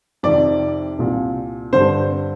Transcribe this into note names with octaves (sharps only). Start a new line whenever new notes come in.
F2 C3 D#3 D5
C2 A#2
G2 D3 C5